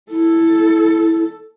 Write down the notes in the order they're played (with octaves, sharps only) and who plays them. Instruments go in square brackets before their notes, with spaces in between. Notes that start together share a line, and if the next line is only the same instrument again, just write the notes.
[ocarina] E4 [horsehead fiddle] A4